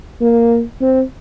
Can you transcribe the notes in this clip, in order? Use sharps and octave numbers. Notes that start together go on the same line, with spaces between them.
A#3
C4